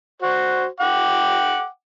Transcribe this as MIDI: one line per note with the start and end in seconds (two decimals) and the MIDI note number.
0.22 0.66 66
0.22 0.66 72
0.80 1.67 78
0.80 1.67 79
0.80 1.67 86